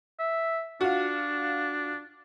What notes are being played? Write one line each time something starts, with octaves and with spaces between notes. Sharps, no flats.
E5
D4 F4 F#4